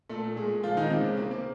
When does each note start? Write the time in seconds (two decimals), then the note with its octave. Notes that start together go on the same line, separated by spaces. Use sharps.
0.09 A#2 A3 A4
0.36 A#2 G#3 G#4
0.63 C#2 F3 F4
0.77 D#3 D#4
0.90 C#2 C3 C4
1.04 C#3 C#4
1.17 C3 A#3 C4
1.31 A#3